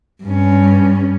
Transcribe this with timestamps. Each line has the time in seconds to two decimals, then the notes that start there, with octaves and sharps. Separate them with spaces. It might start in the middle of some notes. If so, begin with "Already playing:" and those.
0.23 G2 C#4